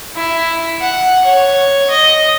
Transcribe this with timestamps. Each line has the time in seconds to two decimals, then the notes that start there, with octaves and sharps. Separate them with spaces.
0.16 E4
0.81 F#5
1.25 C#5
1.90 D#5